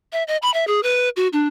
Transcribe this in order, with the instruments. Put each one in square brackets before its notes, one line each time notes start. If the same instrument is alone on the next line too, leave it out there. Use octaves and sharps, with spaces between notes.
[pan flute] E5
D#5
B5
E5
G#4
B4
F#4
D4